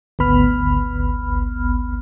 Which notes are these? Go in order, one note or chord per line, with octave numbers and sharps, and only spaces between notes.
G#1 D2 B3 B5 F6